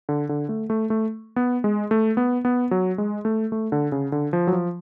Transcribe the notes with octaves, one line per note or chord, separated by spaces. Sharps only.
D3
D3
A3
A3
A3
B3
G#3
A3
B3
B3
F#3
G#3
A3
A3
D3
C#3
D3
F3
F#3
F3